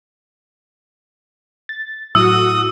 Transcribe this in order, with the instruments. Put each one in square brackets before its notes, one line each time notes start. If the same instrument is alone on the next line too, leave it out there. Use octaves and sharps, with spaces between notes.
[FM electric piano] A6
[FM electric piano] A2 F#3 E4 [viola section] A3 F#4 [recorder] D#6 [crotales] E6